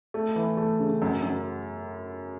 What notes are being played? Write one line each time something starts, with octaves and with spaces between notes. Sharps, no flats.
A3
E3
A3
C#3
F#2
F#2